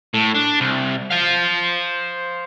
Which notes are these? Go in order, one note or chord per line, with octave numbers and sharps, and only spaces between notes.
A2
D4
C2
C5 F5